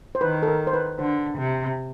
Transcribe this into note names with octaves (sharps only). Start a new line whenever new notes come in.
C5
D#3 B4
A4
A#4
C5
B4
D3 C5
C3